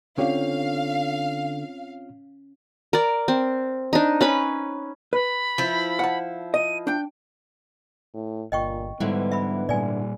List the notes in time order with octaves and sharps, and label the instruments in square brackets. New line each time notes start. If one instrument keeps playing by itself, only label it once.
[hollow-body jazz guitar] D3 G4 [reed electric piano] C4 F4 C#5 [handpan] C#4 [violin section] F5
[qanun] A#4 D5
C4
D4 D#4
C#4 B4 B5
[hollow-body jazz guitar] B4 [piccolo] B5
[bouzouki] F3 E4
[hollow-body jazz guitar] F#5 A5
[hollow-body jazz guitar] D#5 [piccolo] D#7
[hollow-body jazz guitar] D4 G5 [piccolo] G6
[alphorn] A2
[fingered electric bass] G1 [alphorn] A#2 [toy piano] D#5 G5 C#6
[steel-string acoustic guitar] G#2 D3 E3 [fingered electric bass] G3 [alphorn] B3
[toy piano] E5 B5
[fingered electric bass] A#2 G3 [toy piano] D5 G#5